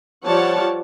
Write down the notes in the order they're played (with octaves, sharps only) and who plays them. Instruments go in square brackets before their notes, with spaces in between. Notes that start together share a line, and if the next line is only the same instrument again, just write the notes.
[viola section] F3 G3 C#5 D5 F#5 A5